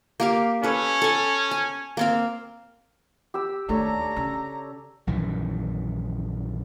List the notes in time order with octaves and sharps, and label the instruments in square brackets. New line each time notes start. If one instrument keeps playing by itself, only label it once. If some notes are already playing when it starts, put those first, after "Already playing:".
[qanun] A#3 G4 F5
[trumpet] C#4 [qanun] A4 B4
[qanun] A4 G#5
G#5
A#3 C4 F5
[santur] G4 E6
[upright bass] D#2 A3 [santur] D4 A4 C#5 [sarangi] A#5
[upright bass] C#3 C#4
[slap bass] A#1 F#2 D#3 E3